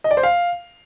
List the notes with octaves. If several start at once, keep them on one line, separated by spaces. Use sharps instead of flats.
D#5
D5
C5
F5